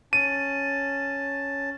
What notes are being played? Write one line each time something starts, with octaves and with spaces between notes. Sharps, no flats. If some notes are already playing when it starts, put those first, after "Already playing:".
C#4 A5 D#7